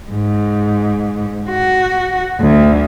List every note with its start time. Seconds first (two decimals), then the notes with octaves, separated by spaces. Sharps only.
0.10 G#2
1.50 F#4
2.40 D2